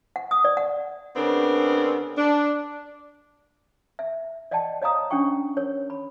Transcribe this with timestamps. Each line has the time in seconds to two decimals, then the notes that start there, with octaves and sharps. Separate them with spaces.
0.16 F#5
0.31 D#6
0.44 D5
0.57 F#5
1.16 C#3 B3 C4 D4 A#4
2.18 D4
3.99 E5
4.51 D5 D#5 F#5 G5 A5
4.82 C#5 D#5 F5 A#5 D#6
5.10 C#4 D4 F#5 G5 C#6
5.57 A#4 C#5
5.90 B5